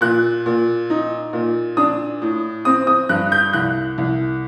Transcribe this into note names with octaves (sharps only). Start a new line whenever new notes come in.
A#2 F#6
A#2
D#4
A#2
D4 D#6
A2
C4 D#6
D#6
G2 F#6
G6
C2 F#6
C2